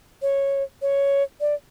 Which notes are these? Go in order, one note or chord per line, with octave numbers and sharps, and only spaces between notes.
C#5
C#5
D5